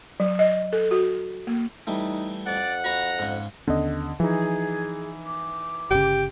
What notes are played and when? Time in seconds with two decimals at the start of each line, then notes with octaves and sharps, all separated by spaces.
0.20 F#3
0.39 D#5
0.73 A4
0.91 F#4
1.47 A#3
1.87 E3 G3 A3 D#4
2.46 F2 D5 F#5
2.84 F2 F#4 B4 A#5
3.19 G#2 C#3
3.68 D#2 D3 B3 C#4 D#5
4.20 E3 F3 D#4 G#4
5.26 D6
5.91 G1 C#3 G4